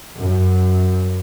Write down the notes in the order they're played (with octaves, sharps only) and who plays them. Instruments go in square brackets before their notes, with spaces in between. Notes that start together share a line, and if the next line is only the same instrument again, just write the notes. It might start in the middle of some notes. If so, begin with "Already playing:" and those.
[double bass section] F#2